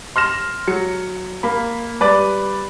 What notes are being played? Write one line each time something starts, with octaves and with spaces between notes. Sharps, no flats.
C6 F6 A#6 E7
F#3 C#7
A#3 B5
G3 B4 D5